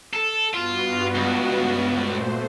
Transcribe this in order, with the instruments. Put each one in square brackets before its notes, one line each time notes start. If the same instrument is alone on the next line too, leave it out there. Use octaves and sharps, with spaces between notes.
[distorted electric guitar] A4
[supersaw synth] G2 B3 F#4 [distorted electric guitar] F4
[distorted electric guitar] C#2
[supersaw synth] A#2 A3 C5